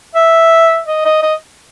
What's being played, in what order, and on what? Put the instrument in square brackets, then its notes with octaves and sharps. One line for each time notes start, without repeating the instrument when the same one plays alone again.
[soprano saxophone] E5
D#5
D#5
D#5